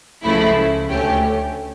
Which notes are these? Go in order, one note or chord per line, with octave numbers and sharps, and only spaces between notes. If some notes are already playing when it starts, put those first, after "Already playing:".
C#2 C#3 F3 A3 E4
D2 D3 A3 C#4 G4